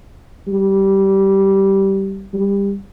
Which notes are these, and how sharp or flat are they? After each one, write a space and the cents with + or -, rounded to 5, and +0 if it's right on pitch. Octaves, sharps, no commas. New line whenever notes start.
G3 -15
G3 +20